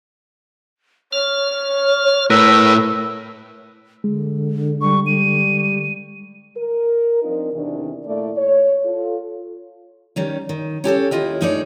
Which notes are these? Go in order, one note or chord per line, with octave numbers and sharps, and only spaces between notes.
C#5 F6
A2 A3 A#4 B4 E6
D3 G#3
G3 C#6
G3 D#7
A#4
F3 C4 D4 D#4 F4
E2 C3 D#3 E3 D4
A#2 A3 E4 D5
C#5
F4 A4
D#3 G3 C#4
D#3
C#4 G4 A4 C#5
D#2 E4 F4 D#5 G5
G2 A3 D#4 G#4 C#5 D5